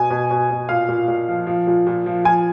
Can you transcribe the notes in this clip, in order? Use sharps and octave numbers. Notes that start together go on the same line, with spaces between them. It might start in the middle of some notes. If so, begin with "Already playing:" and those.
Already playing: B2 G#5
B2
B2
B2
A#2 F5
A#2
A#2
F3
F3
A#2
A#2
F3
F3 G#5